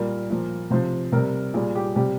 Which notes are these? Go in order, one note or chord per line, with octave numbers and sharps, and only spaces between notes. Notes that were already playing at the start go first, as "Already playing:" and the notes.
Already playing: A#2 G3 A#4
A#2 F3
C3 F3 C5
C3 G3 A#4
A#2 G3 G#4
G4
C3 G3 G4